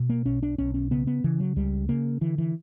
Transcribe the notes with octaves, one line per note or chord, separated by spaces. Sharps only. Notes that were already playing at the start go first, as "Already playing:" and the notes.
Already playing: B2
A#3
B1 C#4
D4
B1 C#4
C#4
C#3 B3
B3
C#3 E3
F#3
C#2 G3
C#3 A#3
D3 E3
E3